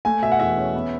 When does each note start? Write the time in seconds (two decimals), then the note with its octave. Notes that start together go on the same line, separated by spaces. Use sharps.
0.05 A3 G#5
0.22 B2 E5
0.32 F#5
0.40 E2 E5
0.57 C#4
0.75 B3